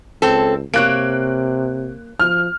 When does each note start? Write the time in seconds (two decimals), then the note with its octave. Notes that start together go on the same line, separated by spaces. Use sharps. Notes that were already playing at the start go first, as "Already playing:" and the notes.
0.22 C#2 C4 A4
0.74 C3 A#3 C#5 F#6 D7
2.20 F3 F6